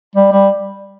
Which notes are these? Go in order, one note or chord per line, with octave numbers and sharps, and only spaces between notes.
G3
G3